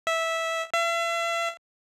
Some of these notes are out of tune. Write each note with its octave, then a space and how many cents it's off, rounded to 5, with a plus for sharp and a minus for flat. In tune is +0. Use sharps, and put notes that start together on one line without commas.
E5 -10
E5 +40